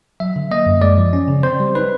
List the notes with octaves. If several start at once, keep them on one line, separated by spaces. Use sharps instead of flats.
F#3 E5
D3
A#3 D#5
F#2
G#3 D5
F3
C#4
C#3
C4 C5
G3
D#4 B4